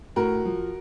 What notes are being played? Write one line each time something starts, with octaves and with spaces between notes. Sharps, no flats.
A2 F#4 A#4
F3